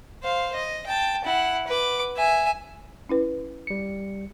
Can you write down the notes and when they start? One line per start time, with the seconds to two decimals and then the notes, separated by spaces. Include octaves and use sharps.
0.23 C5 F5
0.55 D#5
0.87 G5 A5
1.25 E4 F#5
1.67 B4 D6
2.17 E5 G#5
3.09 C#4 E4 B4
3.67 G3 C#7